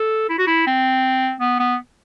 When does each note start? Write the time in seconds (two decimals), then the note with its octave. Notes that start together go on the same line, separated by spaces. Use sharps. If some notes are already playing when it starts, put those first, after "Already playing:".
Already playing: A4
0.29 E4
0.38 F#4
0.47 E4
0.67 C4
1.40 B3
1.59 B3